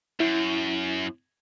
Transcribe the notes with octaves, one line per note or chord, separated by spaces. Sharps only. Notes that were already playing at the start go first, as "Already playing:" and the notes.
F#2 E4